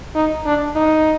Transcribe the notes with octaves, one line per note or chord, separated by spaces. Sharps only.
D#4
D4
D#4